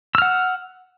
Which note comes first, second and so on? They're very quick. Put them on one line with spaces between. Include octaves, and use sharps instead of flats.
E6 F6 F#5